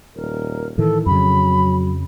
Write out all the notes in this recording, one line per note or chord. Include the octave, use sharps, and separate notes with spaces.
D#1 A#4
A2 D#3 E3 A4
F2 C#3 F#3 B5